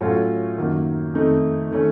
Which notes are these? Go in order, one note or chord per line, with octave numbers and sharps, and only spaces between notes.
A2 F#3 A3 C#4 F4
F#2 D#3 F#3 A#3
F2 D#3 A3 D#4
D#3 A3 C#4